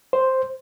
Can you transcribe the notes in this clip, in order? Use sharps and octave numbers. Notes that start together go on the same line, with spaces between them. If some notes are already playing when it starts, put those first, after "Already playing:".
C5